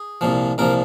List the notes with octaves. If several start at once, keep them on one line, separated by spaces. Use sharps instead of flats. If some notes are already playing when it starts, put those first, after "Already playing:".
Already playing: G#4
C2 A#2 F3
C2 A#2 F3 A#4